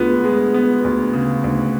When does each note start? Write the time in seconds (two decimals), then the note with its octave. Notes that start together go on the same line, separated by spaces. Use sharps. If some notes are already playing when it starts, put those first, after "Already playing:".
Already playing: D2 G#3 B3 D4 F4
0.24 G#3
0.54 B3
0.84 D2
1.13 C#3
1.44 D2